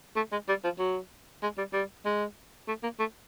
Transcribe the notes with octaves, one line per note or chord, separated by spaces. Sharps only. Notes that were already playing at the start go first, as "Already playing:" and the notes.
A3
G#3
G3
F3
F#3
G#3
G3
G3
G#3
A3
A#3
A3